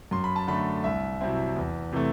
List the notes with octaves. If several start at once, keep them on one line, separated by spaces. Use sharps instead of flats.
F#2 C6
B5
A5
D3 A3 B5
C2 E5
C3 F#3 C4 E4
E2
C3 E3 A3